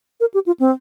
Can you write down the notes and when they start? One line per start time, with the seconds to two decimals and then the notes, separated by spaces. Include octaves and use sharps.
0.20 A#4
0.34 G4
0.46 F4
0.60 C4